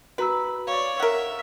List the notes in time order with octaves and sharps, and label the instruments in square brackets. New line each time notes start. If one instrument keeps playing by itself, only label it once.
[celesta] F#4 A#5 E6 [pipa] B4
[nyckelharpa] C#5 D5 [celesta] F5
[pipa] A#4 F#5 [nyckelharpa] E5